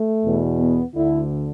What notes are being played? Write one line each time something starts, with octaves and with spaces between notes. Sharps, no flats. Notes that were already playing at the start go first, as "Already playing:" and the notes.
Already playing: A3
E2 B2
B3
D2 D3 E4